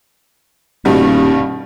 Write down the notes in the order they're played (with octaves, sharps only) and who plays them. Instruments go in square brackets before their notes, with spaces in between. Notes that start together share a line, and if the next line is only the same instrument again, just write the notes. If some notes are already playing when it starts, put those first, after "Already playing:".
[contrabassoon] D#1 [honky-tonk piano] G2 B2 G3